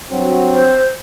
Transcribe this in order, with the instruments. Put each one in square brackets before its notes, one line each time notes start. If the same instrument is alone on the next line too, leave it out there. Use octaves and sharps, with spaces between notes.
[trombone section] G2 F#3 F#4 [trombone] C4
[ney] C5